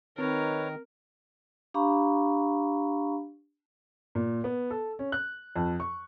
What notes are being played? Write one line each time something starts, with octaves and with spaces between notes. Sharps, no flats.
D#3 C4 D#4 A#4 B4 C#5
D4 G4 F5 A#5 B5 C#6
A#2
B3
A4
C#4
F#6
F2
C#6